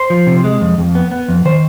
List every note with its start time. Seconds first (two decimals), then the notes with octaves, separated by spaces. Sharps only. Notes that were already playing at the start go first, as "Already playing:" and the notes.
Already playing: C5
0.10 F3
0.27 C3
0.44 G#3
0.61 F2
0.78 F2
0.95 B3
1.11 B3
1.29 F2
1.45 D#3 C5